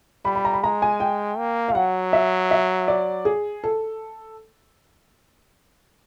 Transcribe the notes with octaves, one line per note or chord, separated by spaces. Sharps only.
G3 B5
B5
A#5
B5
G#3 A#5
G#5
G5
A#3
F5
F#3 F#5
E5
E5
D5
G#4
A4